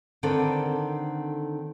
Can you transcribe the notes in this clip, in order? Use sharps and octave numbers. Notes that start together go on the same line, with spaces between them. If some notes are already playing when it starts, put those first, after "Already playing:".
D3 D#3 C4 A4 B4